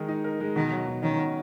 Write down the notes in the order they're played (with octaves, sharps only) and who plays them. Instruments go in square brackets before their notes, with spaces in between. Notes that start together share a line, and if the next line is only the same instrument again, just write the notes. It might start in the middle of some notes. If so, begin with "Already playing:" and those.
Already playing: [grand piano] D#3 G#3 A#4
D#4
A#4
G#3
[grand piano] B2 [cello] D#3
[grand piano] F#3
B2
[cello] D#3 [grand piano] C#4
[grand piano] B2